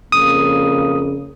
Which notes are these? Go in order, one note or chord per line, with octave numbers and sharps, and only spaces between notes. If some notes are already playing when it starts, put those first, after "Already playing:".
F2 C#3 A#3 D#6